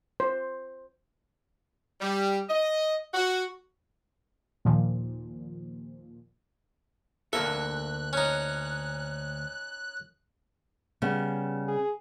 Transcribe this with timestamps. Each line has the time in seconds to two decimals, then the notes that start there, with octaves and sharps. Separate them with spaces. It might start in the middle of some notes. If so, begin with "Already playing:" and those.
0.20 C5
2.01 G3
2.48 D#5
3.14 F#4
4.65 D#2 A#2 F3
7.33 D2 A#3 A4 E5 F#6
8.13 C#4 D#4
11.02 C#3 G3 B3
11.68 G#4